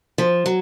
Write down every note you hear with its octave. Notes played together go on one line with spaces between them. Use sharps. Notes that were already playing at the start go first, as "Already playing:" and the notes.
F3
F#3